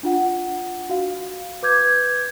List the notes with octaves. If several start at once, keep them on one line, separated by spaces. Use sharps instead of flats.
D4 F4 F#5
F#4 F5
B4 D6 G6 G#6